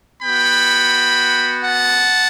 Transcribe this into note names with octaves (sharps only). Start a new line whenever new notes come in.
B3 F#4 G5 B5
F#5 A5